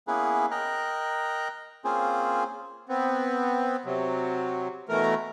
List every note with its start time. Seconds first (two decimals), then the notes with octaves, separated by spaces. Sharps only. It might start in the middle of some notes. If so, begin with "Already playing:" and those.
0.08 A#3 B3 C#4 E4 G#4 B4
0.51 A#4 D#5 G5 A#5 F#6
1.85 A#3 C4 C#4 F4 G#4 C5
2.89 B3 C4
3.85 C3 F#3
4.89 B2 E3 A3 A#4